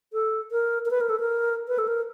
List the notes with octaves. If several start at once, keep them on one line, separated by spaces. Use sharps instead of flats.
A4
A#4
A#4
B4
A#4
A4
A#4
B4
A4
A#4